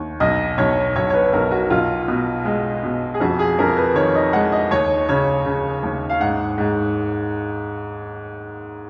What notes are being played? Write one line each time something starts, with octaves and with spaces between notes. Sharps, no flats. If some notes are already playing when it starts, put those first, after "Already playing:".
Already playing: D#2
B1 D#5
B1 C#5
B1 C#5
C#5
B4
B1 A#4
F#4
B1 F4
B2
G#3
B2
G#4
F2 F#4
G#4
F2 A#4
B4
D#3 C#5
D#5
G#3 F#5
D#5
D#2 C#5
C#3 C#5
C#3
D#2
F5
G#2 F#5
G#2